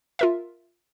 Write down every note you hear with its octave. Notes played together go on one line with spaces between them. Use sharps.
F4 A#4 E5